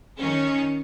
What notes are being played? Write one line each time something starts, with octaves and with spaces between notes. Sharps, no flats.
D#3 C#4